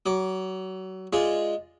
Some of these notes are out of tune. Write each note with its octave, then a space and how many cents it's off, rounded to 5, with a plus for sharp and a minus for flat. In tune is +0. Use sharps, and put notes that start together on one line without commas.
F#3 +25 D6 +0
G#3 +0 F4 +0 D5 +0